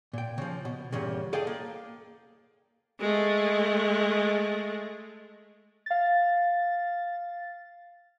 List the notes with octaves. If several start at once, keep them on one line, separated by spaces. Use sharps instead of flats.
A#2 G5
C#3 F3
B2
E2 G2 A#2 C#3
G#4 A4 D5 D#5 F5 G5
A#3
G#3 A3
F5 A6